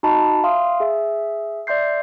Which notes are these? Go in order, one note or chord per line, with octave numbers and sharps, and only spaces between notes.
D#4 F#4 D#5 A5 B5
E5 F5 C6 D#6
G#4 E5
D5 E5 C6 G6 C7